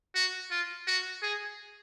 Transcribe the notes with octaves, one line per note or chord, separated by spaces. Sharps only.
F#4
F4
F#4
G#4